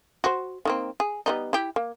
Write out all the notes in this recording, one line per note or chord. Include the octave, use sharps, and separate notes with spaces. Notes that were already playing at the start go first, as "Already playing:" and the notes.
F#4 C5
D#3 A#3 C4
G#4
G3 B3 D#4
E4 G4
A#3